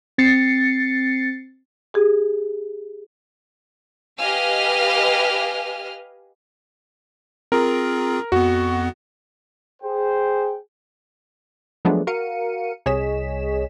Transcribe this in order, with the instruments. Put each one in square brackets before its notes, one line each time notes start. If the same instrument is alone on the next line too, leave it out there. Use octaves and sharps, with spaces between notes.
[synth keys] C4 A6 C7 C#7
[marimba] G4 G#4
[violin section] G4 B4 D#5 F5 G#5 F6
[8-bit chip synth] C4 F4 G#4 [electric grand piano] A#4
[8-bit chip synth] F2 B3 [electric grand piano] F#4
[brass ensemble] G#4 C5 G5
[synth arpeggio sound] F3 F#3 G#3 A3 B3 D4
F#4 A#4 F5 C#7 D#7
C2 G#4 C#5 D#5 B6 E7